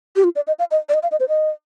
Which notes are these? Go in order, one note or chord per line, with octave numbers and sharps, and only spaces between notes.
G4
F4
D5
D#5
F5
D#5
D5
D#5
F5
D#5
C5
D#5